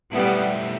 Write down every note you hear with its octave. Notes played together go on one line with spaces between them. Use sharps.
B2 G3 A3 B3 E4